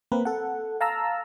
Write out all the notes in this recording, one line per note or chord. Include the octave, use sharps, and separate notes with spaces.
A#3 C4 A#4 B4
A4 F#5
F5 A5 A#5 E6